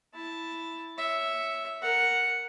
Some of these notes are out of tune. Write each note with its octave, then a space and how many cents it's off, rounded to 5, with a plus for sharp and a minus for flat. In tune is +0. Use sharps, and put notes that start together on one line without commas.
E4 +0 A5 +0
C#5 +0 E5 +0
A#4 +0 F#5 +0